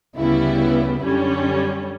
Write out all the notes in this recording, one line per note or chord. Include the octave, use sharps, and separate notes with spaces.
D2 C#3 G3 B3 E4
F#2 D3 G3 C#4